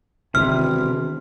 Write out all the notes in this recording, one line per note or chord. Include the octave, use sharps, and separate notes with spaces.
E1 C3 D#3 F6